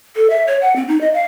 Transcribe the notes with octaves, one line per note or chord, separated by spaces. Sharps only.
A4
E5
C#5
F#5
C4
D#4
D#5
F5